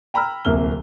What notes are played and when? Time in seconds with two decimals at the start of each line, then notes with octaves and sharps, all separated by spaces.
0.14 G5 A#5 B5 E6 F6
0.45 D1 C2 A#3 F6 G7